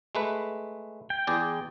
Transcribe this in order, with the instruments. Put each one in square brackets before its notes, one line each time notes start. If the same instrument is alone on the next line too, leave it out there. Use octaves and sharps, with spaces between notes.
[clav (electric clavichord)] G#3 A3 B4
[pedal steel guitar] G5
[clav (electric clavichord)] E2 G#4 D5